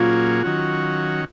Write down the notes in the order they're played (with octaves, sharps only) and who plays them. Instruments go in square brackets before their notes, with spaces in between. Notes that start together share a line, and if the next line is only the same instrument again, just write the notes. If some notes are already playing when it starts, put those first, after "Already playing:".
Already playing: [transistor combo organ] A#2 F#3 A#3 C#4 G#4 [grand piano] F4
[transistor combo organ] D#3 F#3 C#4 F#4